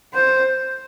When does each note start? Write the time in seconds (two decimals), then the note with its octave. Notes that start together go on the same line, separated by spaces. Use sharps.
0.13 C5